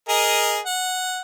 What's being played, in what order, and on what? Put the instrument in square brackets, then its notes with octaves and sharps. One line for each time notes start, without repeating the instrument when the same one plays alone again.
[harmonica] G#4 A#4 D#5
F#5